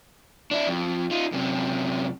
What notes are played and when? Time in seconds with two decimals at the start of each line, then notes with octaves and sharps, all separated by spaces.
0.51 D4 E4
0.67 F2
1.11 D#4 F4
1.32 F#2 C3